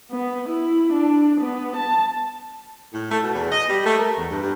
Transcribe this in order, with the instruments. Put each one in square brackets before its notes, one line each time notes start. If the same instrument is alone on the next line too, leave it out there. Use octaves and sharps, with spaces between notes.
[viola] B3
E4
D4
B3
A5
[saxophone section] A2
A3
B2
E2
D#5
G3
A3
A#4
E2
G2
G2